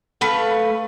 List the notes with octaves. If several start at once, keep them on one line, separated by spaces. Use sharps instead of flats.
A3 B4 F5